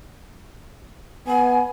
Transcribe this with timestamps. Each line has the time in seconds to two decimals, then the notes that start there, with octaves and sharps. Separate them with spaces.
1.27 B3 G#5